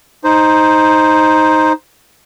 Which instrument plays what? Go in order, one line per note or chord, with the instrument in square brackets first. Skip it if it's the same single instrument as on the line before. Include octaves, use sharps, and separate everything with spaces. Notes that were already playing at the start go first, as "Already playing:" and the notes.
[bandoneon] D#4 C5